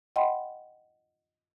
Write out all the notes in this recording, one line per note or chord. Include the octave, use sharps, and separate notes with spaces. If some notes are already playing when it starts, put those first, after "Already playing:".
D#5 F#5 G5 B5 C6